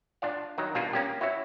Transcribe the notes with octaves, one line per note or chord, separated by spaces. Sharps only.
D4 F4 D5 F5
D#3 F#3 D#4
B2 G3 A#3 D4 F4
A#3 C#4 G4
E4 F#4 C#5 E5